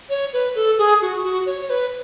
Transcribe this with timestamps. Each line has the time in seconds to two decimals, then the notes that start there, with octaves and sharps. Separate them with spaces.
0.10 C#5
0.33 B4
0.55 A4
0.78 G#4
1.02 F#4
1.24 F#4
1.46 C#5
1.61 C#5
1.70 B4